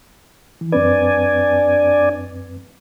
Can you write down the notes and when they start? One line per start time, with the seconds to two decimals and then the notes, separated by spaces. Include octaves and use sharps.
0.61 E3
0.72 F#2 C4 D4 B4 D5 G#5